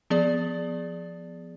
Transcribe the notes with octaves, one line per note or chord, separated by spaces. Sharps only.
F3 B3 G#4 D5